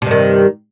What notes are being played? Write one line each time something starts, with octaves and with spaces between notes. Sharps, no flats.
G2 C3 D#3